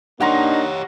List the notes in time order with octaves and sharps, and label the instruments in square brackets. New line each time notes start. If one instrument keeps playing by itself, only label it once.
[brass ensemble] A#3 D#4 [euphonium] D4 [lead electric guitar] G4 C#5 [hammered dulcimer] F#5 A#5 C6